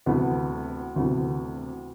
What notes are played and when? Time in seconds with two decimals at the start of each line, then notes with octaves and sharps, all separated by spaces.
0.06 D2 C3 E3 B3
0.96 D2 C3 E3 B3